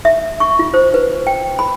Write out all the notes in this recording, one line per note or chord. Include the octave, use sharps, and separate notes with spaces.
E5
C#6
F4
C5
B4
G5
B5